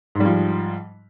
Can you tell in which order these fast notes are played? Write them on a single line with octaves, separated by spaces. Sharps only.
G#2 G3 F3